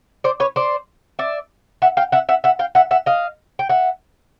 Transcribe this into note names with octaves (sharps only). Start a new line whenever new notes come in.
C5 D5
B4 C#5
C5 D5
D5 E5
E5 F#5
F5 G5
E5 F#5
E5 F#5
E5 F#5
F5 G5
E5 F#5
E5 F#5
D#5 F5
G5
E5 F#5